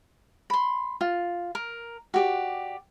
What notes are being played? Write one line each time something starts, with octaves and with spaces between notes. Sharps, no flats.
B5 C6
F4
A#4
F#4 G4 D5